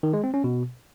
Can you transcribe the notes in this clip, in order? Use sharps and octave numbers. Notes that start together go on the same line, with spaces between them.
D#3
G#3
C4
C#4
B2